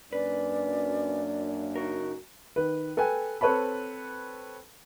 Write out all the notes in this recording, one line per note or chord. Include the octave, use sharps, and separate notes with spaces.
F#2 A#3 C#4 D4 B4 D5
C#3 D#4 F#4 A#4
D#3 B4
A4 B4 G5 G#5
C4 A4 B4 C#5 A5 B5